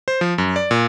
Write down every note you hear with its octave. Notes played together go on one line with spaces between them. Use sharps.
C5
F3
F#2
D5
A#2